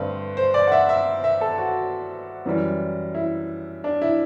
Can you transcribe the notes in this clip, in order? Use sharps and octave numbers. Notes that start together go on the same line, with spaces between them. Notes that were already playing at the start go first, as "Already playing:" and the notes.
Already playing: G2 D3 A3 C4 B4
C5
D5
F#5
E5
E5
E5
A4
F#4
F#2 E3 G3
E4
D4
E4